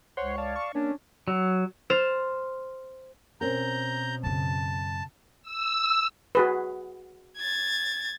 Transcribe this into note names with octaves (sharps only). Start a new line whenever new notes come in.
C#2 C5 C#5 F#5 C6
D5 F5 A5
C#6
A#3 C#4 D4
F#3
C5 F6 A6 E7
B2 C4 C#4 A#4 A#5 G6
F#2 C#3 A5
E6
F#4 G#4 B4
G#6 A6